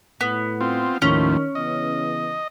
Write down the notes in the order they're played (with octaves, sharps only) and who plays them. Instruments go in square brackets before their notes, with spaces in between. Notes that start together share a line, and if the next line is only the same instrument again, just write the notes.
[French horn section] A2 [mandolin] B3
[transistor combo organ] C4 F4
[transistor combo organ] D#2 A2 F3 [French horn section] D#3 [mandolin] C#4
[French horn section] C#3 E3 B3 [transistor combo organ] D#5